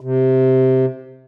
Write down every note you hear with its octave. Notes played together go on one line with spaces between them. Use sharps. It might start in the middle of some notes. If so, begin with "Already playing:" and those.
C3